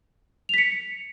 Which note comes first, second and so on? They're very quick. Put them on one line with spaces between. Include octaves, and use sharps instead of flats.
F7 B6 C#7